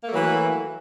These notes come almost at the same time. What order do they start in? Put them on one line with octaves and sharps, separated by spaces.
A#3 A3 F#3 E3 F#4